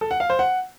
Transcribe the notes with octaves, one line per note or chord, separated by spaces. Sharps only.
A4
F#5
F5
C5
F#5